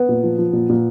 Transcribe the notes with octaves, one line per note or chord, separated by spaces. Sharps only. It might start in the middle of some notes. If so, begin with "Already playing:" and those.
Already playing: B3
A#2
F3
F3
A#2
A#2